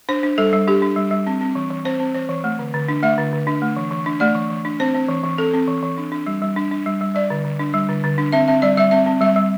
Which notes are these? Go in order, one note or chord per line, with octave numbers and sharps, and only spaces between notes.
D4 C5
D4
G3 A4
G3
D4 G4
D4
G3
G3
C4
C4
E3
E3
C4 C5
C4
E3 C5
E3
A3
D3
D3
D4
A3 E5
D3
D3
D4
A3
E3
E3
D4
A3 D5
E3
E3
D4
C4 C5
C4
E3
E3
C4 A4
C4
E3
E3
D4
D4
G3
G3
D4
D4
G3
G3
G3 D5
D3
D3
D4
G3
D3
D3
D4
C4 E5
C4 E5
G3 D5
G3 E5
C4 E5
C4
G3 E5
G3